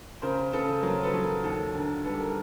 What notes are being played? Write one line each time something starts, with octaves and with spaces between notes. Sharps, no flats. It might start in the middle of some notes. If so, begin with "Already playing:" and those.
C#3 A#4 C5
C#3 A4 B4
F#3 A#4
A4 B4
F#3
A#4
D#2 A4
D3 A#4
G3 A4 B4
A#4